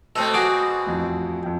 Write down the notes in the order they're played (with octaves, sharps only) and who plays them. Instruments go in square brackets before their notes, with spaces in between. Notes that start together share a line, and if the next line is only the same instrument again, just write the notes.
[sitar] B2 C4 [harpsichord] A3 A4
[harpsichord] F#4 G#4 D6
[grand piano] A1 F2
F2 G5